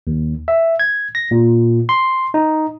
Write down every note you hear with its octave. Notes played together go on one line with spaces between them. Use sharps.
D#2
E5
G#6
A#6
A#2
C6
D#4